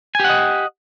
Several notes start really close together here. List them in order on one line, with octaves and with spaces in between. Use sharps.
G#5 G4 F#5 D#5